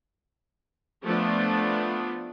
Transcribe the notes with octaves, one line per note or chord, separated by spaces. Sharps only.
F3 A3 B3 D4